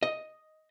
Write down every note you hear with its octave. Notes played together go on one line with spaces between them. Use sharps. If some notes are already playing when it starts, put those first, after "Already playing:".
D#5